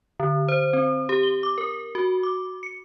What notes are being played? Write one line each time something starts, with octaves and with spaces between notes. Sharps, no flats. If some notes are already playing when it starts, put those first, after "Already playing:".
D3
C5
C4
G4
G7
D6
A#4
F#4
D6
C#7